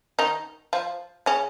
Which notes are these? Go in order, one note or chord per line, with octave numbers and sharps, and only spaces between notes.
D#3 D#4
F3 F4
C#3 C#4